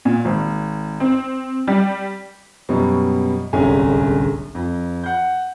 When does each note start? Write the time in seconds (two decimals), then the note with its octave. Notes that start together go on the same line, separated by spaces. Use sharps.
0.05 A#2
0.25 G#1
1.00 C4
1.68 G3
2.69 F#2 B2 G3
3.53 D1 G1 C2 C#4 G#4 G#5
4.55 F2
5.04 F#5 G6